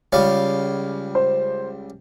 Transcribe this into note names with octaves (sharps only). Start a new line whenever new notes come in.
C#2 G3 C#5 F5
C5